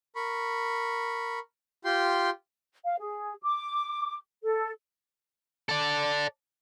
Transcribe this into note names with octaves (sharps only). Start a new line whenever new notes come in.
A#4 B5 C#6
F4 G4 G5 C6
F5
G#4
D6
A4
A4 D5